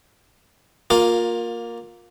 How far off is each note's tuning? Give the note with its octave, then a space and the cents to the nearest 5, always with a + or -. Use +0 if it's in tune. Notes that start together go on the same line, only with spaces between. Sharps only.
A#3 +0 F4 +25